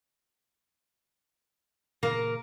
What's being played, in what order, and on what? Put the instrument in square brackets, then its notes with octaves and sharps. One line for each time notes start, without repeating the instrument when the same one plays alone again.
[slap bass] A#2 C#3 E3 [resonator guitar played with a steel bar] A#3 A#4